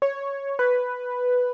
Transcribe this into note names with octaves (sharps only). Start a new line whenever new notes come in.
C#5
B4